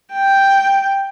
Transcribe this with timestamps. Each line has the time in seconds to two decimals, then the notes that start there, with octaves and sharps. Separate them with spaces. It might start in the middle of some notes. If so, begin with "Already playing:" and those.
0.14 G5